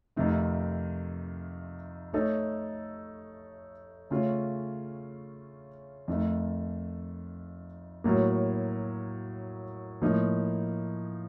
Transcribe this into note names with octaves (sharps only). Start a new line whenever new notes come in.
F2 C3 D#3 A3
A3 D#4 A4 C#5
C#3 A3 C#4 F4
F2 D#3 A3
A2 F#3 A#3
A2 F3 A#3 D#4